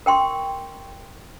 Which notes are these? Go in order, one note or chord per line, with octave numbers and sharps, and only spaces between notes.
A#4 G5 C6 C#6